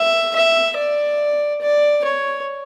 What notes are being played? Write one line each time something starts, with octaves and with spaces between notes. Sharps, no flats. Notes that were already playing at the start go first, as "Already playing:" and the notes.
Already playing: E5
E5
D5
D5
C#5